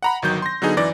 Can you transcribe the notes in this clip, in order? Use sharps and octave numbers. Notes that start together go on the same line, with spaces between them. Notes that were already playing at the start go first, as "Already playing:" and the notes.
F#5 A#5 B5
G1 D#3 F#3 G6
C6 A#6
D3 F#3 B3 D#4 G#4
F#2 E3 D5 A#6